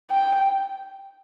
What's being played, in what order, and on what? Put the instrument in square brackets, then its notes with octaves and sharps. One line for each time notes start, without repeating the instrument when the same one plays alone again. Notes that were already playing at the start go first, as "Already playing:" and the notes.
[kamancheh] G5